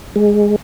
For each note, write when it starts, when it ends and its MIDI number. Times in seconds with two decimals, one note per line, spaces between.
0.16 0.56 56